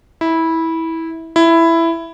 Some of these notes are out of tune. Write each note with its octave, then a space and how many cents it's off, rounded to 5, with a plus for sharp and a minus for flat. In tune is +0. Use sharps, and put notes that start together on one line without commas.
E4 -15
E4 +10